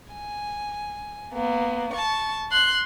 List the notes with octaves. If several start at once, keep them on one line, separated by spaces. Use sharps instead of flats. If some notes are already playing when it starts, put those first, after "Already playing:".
G#5
A#3 B3
A5 C#6
C6 F#6